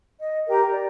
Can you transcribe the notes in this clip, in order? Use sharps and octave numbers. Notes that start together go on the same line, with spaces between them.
D#5
G4 A#4 G5 A#5
D5